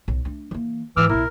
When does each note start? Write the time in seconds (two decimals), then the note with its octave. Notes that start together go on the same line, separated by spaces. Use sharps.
0.08 B1
0.25 A3 D4
0.51 E3 A#3
0.97 G#2 E3 D6 E6 F6
1.09 B1 B2 E4 A#4